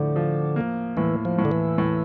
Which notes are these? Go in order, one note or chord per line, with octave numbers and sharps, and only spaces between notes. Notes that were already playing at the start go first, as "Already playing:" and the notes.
Already playing: A2 D3 F3
F3
A#3
A2 E3
F3
A2
D3
E3
A2